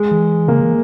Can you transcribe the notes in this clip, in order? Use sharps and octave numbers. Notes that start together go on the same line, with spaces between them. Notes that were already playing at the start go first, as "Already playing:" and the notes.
Already playing: G#3
E3
C#3 A#3
E3